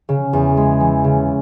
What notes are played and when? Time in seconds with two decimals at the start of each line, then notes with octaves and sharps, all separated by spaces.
0.09 C#3
0.33 E2
0.57 G#3
0.80 E3
1.04 C#3